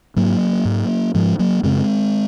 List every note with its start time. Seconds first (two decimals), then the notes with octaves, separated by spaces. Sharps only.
0.16 G#2 F#3 A#3
0.65 G#2
1.15 G#2 F3 G#3
1.39 F#3 A#3
1.63 F#2 C#3 G#3 C4